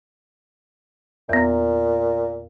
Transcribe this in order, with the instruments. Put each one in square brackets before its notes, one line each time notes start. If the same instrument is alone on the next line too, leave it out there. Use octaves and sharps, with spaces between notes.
[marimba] E2 B3 [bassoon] A#2